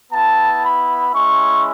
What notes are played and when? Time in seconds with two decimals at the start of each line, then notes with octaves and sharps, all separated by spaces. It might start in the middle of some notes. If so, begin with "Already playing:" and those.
0.12 B3 E4 A5
0.63 B5
1.12 G#3 C#4 E4 C#6